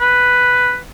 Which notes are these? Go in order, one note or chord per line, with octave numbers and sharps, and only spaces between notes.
B4